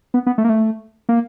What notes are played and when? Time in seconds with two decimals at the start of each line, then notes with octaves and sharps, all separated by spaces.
0.14 B3
0.27 B3
0.38 A3
0.44 A#3
0.49 A3
1.09 A#3